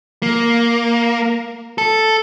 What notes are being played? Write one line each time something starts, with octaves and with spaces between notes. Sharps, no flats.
A#3
A4